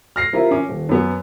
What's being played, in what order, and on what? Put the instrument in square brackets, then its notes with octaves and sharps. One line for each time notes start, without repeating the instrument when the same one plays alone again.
[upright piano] F6 A#6 C7
G3 C4 E4 F4 A#4
C#4 D6
D#1
F#2 B3